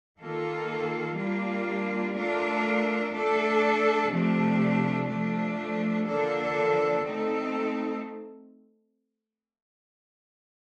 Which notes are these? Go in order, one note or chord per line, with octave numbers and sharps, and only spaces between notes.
D#3 A#3 F4 A4
G3 A#3 D4 F4
A3 D4 F4 A#4
A3 D4 A4
C3 F3 A3 D4
F3 A3 D4
D3 F3 A#3 D4 A4
A3 C4 D#4 A4